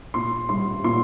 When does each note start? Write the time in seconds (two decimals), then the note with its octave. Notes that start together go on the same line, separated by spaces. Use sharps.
0.14 A#2 C6
0.49 G3 C6
0.84 A#2 C6